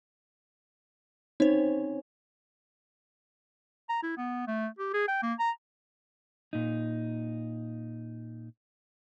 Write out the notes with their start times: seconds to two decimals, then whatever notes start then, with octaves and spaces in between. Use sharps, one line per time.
1.40 C4 C#4 D#4 C5 C#5
3.89 A#5
4.03 E4
4.17 B3
4.47 A3
4.79 G4
4.94 G#4
5.08 G5
5.23 A#3
5.39 A#5
6.53 A#2 D#4